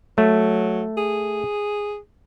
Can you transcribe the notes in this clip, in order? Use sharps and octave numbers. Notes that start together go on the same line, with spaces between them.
F#3 A3
G#4